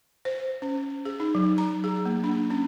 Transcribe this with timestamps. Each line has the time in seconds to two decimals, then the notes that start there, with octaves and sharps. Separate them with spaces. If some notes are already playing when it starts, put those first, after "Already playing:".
0.25 C5
0.62 C#4
1.05 G#4
1.20 D#4
1.35 F#3
1.58 A#5
1.84 G#4
2.05 A#3
2.24 D4
2.50 C#4